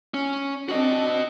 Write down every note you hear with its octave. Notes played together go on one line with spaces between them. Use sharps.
C#4
C4 D4 F#4 D#5